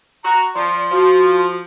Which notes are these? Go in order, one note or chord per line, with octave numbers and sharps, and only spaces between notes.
F#4 A#5
F3 D5 C6
F3 F#4